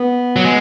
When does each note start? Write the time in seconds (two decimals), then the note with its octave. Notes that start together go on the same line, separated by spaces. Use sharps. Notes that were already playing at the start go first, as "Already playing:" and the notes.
Already playing: B3
0.36 F#3
0.44 G#3